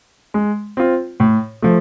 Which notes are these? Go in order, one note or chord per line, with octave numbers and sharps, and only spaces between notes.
G#3
C4 F4
A2
F3 A3